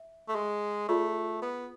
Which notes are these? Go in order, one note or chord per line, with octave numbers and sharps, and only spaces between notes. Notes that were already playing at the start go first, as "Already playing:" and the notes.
Already playing: E5
A3
G#3
A3 F4 G#4 D5
B3